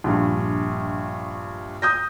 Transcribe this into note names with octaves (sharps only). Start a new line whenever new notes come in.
A#1 G2
D#6 G6 A#6